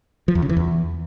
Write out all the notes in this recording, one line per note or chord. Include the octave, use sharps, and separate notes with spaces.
F3
E2
C#3
E3
E2